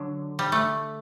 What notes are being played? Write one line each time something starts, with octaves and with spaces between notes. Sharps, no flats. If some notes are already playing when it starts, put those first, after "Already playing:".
Already playing: D3 F#3
G3
A3